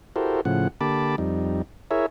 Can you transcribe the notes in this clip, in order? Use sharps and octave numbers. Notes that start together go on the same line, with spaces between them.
E4 F#4 G4 A4 A#4 C5
A2 C#3 F3 F#5
D3 A#3 G4 A5 B5 D6
F2 G3 D#4
E4 G#4 A#4 C#5 E5